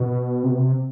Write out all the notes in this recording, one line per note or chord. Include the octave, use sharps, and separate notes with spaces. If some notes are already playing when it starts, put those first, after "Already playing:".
Already playing: B2
C3
B2
C3